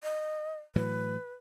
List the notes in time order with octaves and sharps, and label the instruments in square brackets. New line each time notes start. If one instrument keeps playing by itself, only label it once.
[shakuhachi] D#5
[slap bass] A2 E3 F#3 [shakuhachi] B4